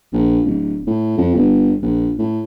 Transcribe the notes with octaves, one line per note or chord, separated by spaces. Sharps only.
A#1
D1
A2
F2
G1
A#1
A2